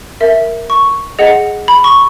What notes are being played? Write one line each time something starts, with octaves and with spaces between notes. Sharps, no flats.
A#4 E5
C#6
G#4 D#5 F#5
B5
C#6